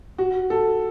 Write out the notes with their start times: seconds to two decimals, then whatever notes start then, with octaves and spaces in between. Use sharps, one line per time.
0.18 F#4
0.50 A4